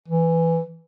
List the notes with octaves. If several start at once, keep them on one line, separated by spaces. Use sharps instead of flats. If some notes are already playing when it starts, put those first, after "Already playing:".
E3